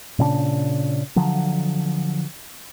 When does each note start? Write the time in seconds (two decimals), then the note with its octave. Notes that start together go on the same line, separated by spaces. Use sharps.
0.19 A#2 C#3 C4 D4
1.16 D3 F3 F#3